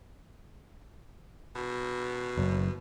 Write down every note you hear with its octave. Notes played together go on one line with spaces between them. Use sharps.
B2
F#1